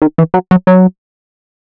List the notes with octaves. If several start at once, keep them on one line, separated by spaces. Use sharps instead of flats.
D#3
E3
F#3
F#3
F#3